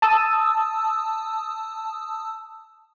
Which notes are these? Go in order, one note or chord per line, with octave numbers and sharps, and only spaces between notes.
A5 D#6 E6